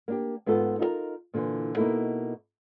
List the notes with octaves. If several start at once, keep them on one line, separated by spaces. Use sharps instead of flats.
A#3 D4 G4
G#2 B3 F4 A4
D#4 F4 G#4 A#4
A#2 D3 E3
B2 A#3 D#4 E4 A4